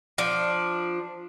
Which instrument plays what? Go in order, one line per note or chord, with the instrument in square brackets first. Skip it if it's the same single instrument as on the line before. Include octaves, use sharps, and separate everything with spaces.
[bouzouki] F3 D4